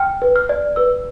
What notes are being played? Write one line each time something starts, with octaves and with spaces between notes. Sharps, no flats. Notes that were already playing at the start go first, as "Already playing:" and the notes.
Already playing: G5 F6
B4
F6
D5
B4 E6